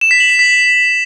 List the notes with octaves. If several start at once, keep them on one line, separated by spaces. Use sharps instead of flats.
E7
B6
F#7
E7
B6